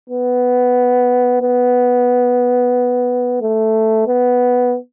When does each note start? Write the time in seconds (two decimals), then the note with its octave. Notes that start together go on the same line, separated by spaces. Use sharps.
0.10 B3
1.42 B3
3.42 A3
4.07 B3